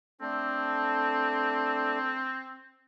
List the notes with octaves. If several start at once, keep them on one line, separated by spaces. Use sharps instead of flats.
A3 C4 D4 A4